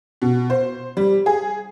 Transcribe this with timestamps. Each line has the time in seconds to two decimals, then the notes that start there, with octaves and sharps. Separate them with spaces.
0.22 B2
0.50 C5
0.97 G3
1.26 G#4